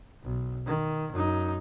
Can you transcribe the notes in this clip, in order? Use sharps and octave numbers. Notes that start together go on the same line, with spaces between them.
B1
D#3
F#2 D#4